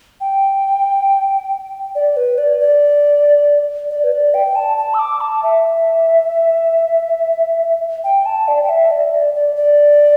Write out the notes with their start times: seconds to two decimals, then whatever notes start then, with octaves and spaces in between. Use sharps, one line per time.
0.21 G5
1.95 D5
2.17 B4
2.38 D5
2.60 D5
3.90 D5
4.04 B4
4.12 D5
4.34 G5
4.56 A5
4.77 A5
4.94 E6
4.99 D6
5.21 A5
5.43 E5
8.04 G5
8.26 A5
8.48 D5
8.63 G5
8.69 E5
8.91 D5
9.13 D5
9.34 D5
9.56 D5